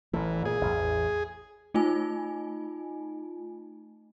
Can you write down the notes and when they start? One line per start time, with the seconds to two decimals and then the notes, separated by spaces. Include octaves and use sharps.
0.14 A1 E3 A3
0.45 A#2 G#4
0.61 A1 E2
1.74 A3 D#4 F4 G#5